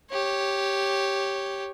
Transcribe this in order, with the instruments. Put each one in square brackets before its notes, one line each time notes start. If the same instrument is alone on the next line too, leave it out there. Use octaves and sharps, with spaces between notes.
[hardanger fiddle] G4 C#5